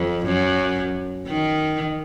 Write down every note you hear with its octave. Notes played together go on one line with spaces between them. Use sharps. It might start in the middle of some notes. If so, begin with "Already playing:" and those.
Already playing: F2
F#2
D#3